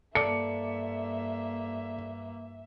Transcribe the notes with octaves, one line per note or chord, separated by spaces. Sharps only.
G2 A#3 A4 D5 E5 C#7